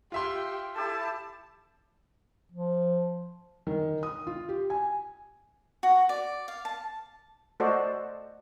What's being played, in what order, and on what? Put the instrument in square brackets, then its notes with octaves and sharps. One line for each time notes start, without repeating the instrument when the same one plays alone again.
[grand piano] F4 E5 C6 [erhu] G4
[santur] E4 G4 A4 [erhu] A5
[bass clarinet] F3
[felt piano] D#3
D#6
F4
G4
G#5
[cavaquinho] F#4
D5
F5
A5
[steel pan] A3 F#4 A4 C5 D5 D#5